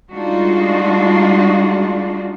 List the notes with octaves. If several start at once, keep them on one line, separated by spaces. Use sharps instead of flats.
G3 G#3 D4 D#4 F4 F#4